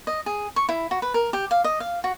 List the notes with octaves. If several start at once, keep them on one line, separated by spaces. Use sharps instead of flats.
D#5
G#4
C#6
E4
F#4
B4
A#4
G4
F5
D#5
F5
F#4